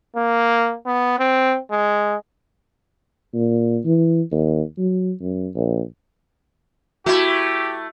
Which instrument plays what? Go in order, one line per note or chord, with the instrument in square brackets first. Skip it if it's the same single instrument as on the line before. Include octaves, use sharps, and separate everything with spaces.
[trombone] A#3
B3
C4
G#3
[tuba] A#2
E3
D#2
F#3
F#2
A#1
[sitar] A3 E4 [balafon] F#4 [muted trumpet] G4